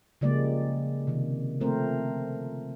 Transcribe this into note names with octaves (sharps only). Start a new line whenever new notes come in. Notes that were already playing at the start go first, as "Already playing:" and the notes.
C#3 F3 G3 G#3 A#3 D5
C3 D#3
F3 A3 C4 A#4 C5